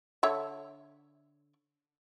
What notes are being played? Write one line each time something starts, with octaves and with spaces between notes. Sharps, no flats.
D3 C#5 E5